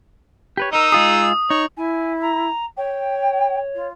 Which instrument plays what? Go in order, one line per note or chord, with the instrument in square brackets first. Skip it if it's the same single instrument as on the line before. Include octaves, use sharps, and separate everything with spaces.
[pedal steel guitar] G4 B4 C#5
[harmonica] D#4 E6 [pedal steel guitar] A#4 D#5
[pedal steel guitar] G#3 F4 G#4 [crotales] D#6
[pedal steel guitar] D#4 [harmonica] C#5
[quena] E4 [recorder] G#5
[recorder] A#5
[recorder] C#5 [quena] G5
[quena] F4